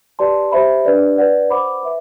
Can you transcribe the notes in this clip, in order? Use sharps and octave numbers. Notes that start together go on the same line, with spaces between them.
G4 B4 D5 A5 C6
G4 C5 E5 B5
D4 G4 B4 D5
B4 D5 F#5
C5 F#5 B5 D6
B4 E5